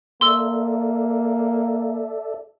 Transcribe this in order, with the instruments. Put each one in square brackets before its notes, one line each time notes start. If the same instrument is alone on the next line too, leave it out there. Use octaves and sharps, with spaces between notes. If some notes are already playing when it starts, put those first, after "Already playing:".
[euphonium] A#3 [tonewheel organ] A4 D5 E5 [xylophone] C6 E6